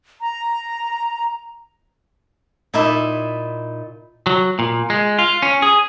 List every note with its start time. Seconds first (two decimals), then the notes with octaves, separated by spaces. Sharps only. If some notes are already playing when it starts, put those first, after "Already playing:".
0.21 A#5
2.74 A#2 D#4 E4 E5
4.27 F#3
4.59 A#2
4.90 G#3
5.19 F4
5.42 C#4
5.62 G#4